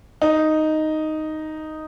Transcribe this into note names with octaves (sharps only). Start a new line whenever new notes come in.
D#4